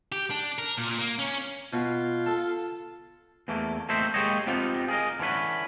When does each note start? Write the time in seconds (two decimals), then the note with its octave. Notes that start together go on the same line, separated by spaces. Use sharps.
0.12 G4
0.31 D4
0.58 A#4
0.78 A#2
0.99 A#3
1.19 C#4
1.73 B2 F4
2.26 A4
3.48 E2 E3 A3 A#3
3.89 A3 A#3 C4 D#4 C5 E5
4.14 G#3 A#3 G4 C5 C#5 D#5
4.47 B3 C4 D#4 F4 G4
4.88 G#4 A#4 D#5
5.19 D3 E3 C#4 B4